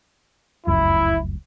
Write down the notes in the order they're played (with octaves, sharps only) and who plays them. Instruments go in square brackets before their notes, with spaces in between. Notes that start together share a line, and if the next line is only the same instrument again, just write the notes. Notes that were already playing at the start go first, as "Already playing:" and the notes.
[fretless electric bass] F1 C#2 F#2 [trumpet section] E4